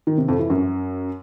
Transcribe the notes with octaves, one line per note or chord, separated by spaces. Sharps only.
D#3
C3
F2
E3
F#2